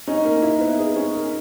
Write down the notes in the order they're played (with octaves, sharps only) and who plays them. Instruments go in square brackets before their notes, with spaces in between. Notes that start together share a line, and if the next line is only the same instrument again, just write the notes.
[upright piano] C#4 [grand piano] D#4
[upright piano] A#3
E4
B3
G#4
C#4
A#4